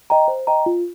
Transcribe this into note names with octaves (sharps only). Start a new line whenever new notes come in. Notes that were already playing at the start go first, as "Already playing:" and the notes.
D#5 G5 A#5
C5
D#5 G5 A#5
F4